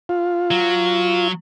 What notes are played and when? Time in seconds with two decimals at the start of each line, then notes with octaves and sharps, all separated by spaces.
0.09 F4
0.51 F#3